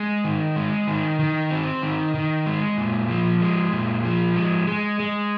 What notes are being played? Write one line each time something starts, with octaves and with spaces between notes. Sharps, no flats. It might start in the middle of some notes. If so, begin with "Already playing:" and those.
Already playing: G#3
D#3
G#3
D#3
D#3
C4
D#3
D#3
G#3
A#2
F3
G#3
A#2
F3
G#3
G#3
G#3